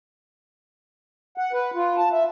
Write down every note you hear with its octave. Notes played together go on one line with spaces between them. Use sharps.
F#5
B4
F4
A5
E5